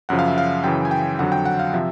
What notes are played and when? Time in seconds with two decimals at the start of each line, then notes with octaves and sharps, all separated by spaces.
0.09 F#2 C#3 F3 F#5
0.19 F5
0.28 E5
0.38 F5
0.64 F#2 C#3 E3 G5
0.85 G#5
0.91 G5
1.19 F2 D3 F#3 F#5
1.32 G5
1.45 F#5
1.59 F5
1.74 C3 F3 E5